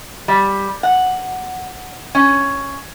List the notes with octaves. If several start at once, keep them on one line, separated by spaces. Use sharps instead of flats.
G3
F#5
C#4